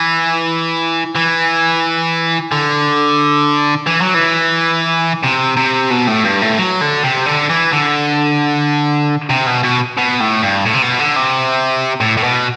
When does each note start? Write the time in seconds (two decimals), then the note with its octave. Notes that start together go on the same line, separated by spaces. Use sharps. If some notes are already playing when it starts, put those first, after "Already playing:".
Already playing: E3
1.16 E3
2.52 D3
3.87 E3
4.02 F#3
4.15 E3
5.23 C3
5.57 C3
5.91 B2
6.07 A2
6.25 G2
6.42 A2
6.59 F#3
6.82 D3
7.04 C3
7.26 D3
7.49 E3
7.72 D3
9.30 C3
9.47 B2
9.64 B2
9.98 B2
10.21 A2
10.43 G2
10.66 A2
10.74 C3
10.82 B2
10.99 D3
11.16 C3
12.01 A2
12.17 A2
12.23 B2